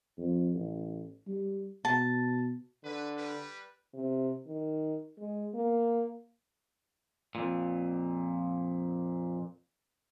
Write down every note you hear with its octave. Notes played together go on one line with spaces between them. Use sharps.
F2
A1
G3
B2 A5
D3 B4
G3 B4
C3
D#3
G#3
A#3
F2 A#2